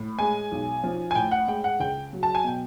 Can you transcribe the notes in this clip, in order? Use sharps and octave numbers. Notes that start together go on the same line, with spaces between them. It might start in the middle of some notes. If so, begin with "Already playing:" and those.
Already playing: A2
G#3 G#5
B1
F3
G#5
A2 G5
F#5
G#3 G5
F#5
C#2 G5
F#3
A5
G#5
B2 G5